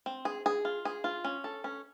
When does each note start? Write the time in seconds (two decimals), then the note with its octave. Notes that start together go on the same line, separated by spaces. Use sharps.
0.06 C4
0.25 G#4
0.46 G#4
0.65 F4
0.85 G#4
1.04 F4
1.24 C#4
1.44 A4
1.64 C#4